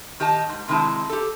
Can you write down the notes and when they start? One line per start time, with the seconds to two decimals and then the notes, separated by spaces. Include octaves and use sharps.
0.20 D#3 G4 D#5 A5
0.49 G#2
0.68 C3 D#3 G#3 C4 E4 A5
1.09 G4 A4